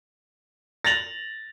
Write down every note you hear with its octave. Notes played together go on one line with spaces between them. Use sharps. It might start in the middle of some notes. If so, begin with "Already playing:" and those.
A6 A#6 F7 F#7